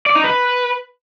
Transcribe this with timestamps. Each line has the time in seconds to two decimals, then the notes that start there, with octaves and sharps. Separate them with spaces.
0.06 D5
0.15 D#4
0.24 B4